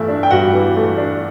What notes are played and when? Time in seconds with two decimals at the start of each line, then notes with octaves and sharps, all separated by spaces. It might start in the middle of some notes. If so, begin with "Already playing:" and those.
Already playing: G2 E3 A3 E4
0.08 D4
0.23 G5
0.31 G2 F#4 F#5
0.54 E3
0.76 A3
0.98 D4